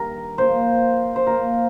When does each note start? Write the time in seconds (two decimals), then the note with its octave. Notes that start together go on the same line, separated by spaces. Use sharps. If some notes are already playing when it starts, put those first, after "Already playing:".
Already playing: G2 D#3 A#4
0.38 A#2 F3 C5
1.16 C5
1.26 A#2 F3 A#4